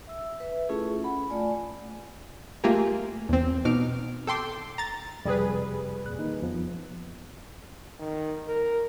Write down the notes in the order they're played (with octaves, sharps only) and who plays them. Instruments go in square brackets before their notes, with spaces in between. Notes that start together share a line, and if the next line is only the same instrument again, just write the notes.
[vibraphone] E5 E6
B4 E5
A3 C#4 E4 F4 G#4 A4
F#5 B5
A3 F4 D5 G#5
[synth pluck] A3 A#3 F4 G4 G#4 A#4
E2 C4
B2 D#4 D6 F6
A4 G5 C6 D6
A#5 A6
[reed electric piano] F2 C3 [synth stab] G3 G#4 B4
[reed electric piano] E2 A#2 F#6
D#3 A#3 D#4
F2 F3 B3
[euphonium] D#3
A#4